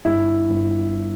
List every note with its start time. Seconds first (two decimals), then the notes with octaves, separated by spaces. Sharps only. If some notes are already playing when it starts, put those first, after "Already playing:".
0.05 G1 E4
0.50 G1